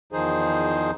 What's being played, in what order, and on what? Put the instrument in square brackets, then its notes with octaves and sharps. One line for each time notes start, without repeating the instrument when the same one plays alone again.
[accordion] E2 D#3 F3 D#4 G#4 C5